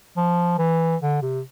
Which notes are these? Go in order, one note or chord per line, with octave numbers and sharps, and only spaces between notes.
F3
E3
D3
C3